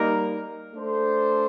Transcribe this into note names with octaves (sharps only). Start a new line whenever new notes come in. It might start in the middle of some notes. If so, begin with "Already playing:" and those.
Already playing: G3 A#3 D#4 A#4
A3 D4 A4 C5